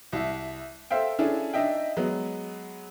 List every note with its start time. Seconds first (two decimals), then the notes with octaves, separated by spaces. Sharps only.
0.13 C2 E5
0.91 A4 C5 E5 F5 G5
1.19 C#4 D4 E4 G#4 A4
1.54 D4 D#4 D#5 E5 G5
1.97 F#3 G#3 B3